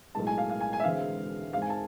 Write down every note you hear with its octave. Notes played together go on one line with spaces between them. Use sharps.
B1 A2 G#3 A5
G#5
F5
F5
G#5
G#5
E5
E1 E2 D3 G#3 C4 F5
G#2 G#3 C4 F5
G#5
A5